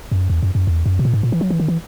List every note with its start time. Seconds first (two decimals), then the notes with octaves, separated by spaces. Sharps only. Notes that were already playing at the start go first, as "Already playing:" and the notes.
0.12 F#2
0.30 E2
0.43 F#2
0.55 F#2
0.67 E2
0.86 F#2
0.99 B2
1.05 A#2
1.13 G#2
1.23 A#2
1.32 E3
1.41 F#3
1.50 E3
1.60 D#3
1.68 E3